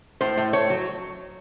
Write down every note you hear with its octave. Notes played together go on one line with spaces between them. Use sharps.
A2 C5
A2
A3 C#5
F#3